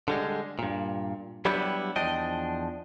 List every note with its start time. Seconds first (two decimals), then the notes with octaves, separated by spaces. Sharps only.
0.08 D3 G3 G#3
0.59 G2 A#2
1.45 F#3 G3 B3 D4 E4 G4
1.96 E2 F3 D4 D#5 G5